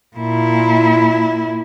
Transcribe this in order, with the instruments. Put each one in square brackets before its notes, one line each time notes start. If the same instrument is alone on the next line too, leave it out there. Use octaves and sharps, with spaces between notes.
[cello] A#2 E4